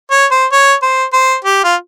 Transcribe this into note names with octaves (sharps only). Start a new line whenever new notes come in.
C#5
C5
C#5
C5
C5
G4
F4